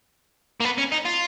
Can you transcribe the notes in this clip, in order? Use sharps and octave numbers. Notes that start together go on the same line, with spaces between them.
A#3
B3
C#4
D#4
F4